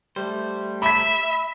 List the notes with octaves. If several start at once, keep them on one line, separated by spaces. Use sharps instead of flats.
G3 A3 C5
E5 B5 B6